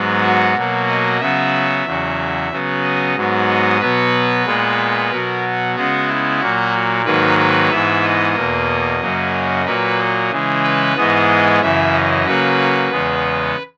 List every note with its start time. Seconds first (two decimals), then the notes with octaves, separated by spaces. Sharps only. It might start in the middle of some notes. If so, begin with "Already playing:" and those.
Already playing: G#2 F#3 B3
0.23 F#4
0.55 B2 F#3 A#3
0.88 D#5
1.21 C#3 F#3 B3 E5
1.85 E2 C#3 F#3
2.51 C#3 F#3 B3
2.83 D#5
3.16 G#2 F#3 B3
3.48 D#5
3.80 B2 F#3 B3 B4
4.46 A#2 G#3 B3
5.11 B2 F#3 B3 A#4
5.76 C#3 G#3 B3 F#4
6.08 E4
6.40 A#2 F#3 A#3 F#4
7.06 G#2 D#3 F#3 A#3 B4
7.39 B4
7.71 G#2 E3 B3 E5
8.03 D#5
8.36 E2 B2 A#3
9.01 F#2 C#3 F#3 A#3
9.66 A#2 F#3 A#3 B4
9.98 D#5
10.31 C#3 E3 G#3
10.64 B4
10.96 G#2 E3 G#3 B3 D#5
11.28 D#5
11.61 F#2 C#3 E3 E5
11.93 D#5
12.26 C#3 F#3 A#3 B4
12.91 E2 C#3 G#3 B3